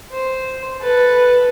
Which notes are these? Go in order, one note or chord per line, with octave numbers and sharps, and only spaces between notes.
C5
A4 B4